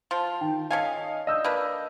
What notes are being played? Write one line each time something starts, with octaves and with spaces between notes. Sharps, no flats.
F3 F4 A5
D#3 G5
C#4 A4 D#5 F5 G#5
D5 D#5 E6 G6
A#3 D4 B4